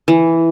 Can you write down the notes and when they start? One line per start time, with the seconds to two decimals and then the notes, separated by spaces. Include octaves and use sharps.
0.08 E3